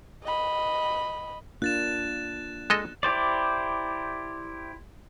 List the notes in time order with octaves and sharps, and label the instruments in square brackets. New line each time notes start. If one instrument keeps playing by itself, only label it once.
[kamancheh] D#5 B5
[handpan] A#3 D4 F4 [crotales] F#6 A6 E7
[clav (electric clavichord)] G#3 A4 D#5
[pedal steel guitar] E4 G4 C5 D5